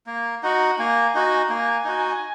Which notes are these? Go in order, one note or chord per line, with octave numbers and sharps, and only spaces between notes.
A#3
D#4 F#4 F#5
A#3 G#5
D#4 F#4
A#3 G#5
D#4 F#4